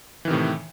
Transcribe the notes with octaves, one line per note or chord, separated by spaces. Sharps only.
A2 C3 D#3 E3